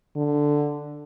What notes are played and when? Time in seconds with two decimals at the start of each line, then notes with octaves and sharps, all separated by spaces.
0.16 D3